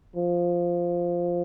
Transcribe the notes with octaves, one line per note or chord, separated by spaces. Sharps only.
F3